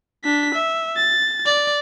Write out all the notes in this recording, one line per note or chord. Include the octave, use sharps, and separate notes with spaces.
D4 B6
E5
A6
D5